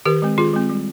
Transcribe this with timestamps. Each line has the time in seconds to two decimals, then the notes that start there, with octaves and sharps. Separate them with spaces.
0.06 D#3 G4 A#4
0.22 G#3 C4
0.38 D#3 F4 G#4
0.54 G#3 C4
0.69 G3